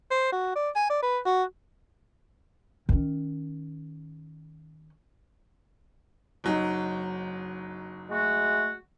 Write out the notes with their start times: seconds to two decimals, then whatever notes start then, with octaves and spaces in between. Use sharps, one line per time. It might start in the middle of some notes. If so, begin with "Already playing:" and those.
0.11 C5
0.32 F#4
0.56 D5
0.76 G#5
0.90 D5
1.03 B4
1.26 F#4
2.89 D#3 C#4
6.44 F#1 F#3 D#4
8.09 G#3 A3 F#4